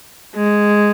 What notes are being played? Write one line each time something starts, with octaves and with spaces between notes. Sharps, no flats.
G#3